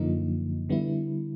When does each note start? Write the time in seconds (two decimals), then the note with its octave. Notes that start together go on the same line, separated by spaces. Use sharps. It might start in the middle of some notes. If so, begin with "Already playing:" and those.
Already playing: F#2 D3 F3 A#3 D#4
0.69 D3 G3 B3 E4